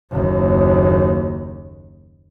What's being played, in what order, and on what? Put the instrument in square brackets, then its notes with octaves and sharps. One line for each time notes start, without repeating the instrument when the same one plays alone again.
[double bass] F#1 D#2